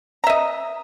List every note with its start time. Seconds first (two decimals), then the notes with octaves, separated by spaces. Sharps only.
0.24 A#5
0.27 E5
0.30 D#5